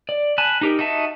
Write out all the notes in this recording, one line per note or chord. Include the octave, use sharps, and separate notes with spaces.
D5
G#5 A5 B5 F#6
D#4 G4 A#4
D#4 F#4 E5 A5